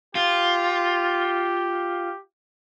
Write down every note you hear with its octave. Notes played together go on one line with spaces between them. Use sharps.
F4 G4